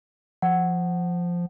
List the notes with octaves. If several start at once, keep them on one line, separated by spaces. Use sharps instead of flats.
F3 F#5